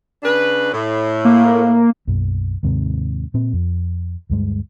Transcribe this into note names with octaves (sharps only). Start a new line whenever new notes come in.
C#3 D4 B4
A2
A#3
B1 F#2 A#3
D#2 G#2 C3
A#2 C4
F2
D2 G2 G#3